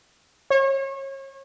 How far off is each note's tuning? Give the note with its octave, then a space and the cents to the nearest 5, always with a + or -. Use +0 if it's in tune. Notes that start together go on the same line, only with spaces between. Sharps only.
C#5 -35